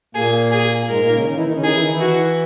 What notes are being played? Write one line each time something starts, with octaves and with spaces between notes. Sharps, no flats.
A#2 A#3 G#4
G#4
G#2 G#3 A#4
A#2 A#3
D#4
C#3 C#4
D#3 D#4
E3 E4
D#3 D#4
C#3 C#4
D#3 D#4 G#4
E3 E4
D#3 D#4
E3 E4
F#4